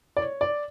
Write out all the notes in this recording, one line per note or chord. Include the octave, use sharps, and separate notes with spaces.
D5
C#5
D5